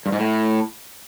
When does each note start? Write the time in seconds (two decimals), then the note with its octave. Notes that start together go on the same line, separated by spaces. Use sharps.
0.06 G2
0.12 G#2
0.19 A2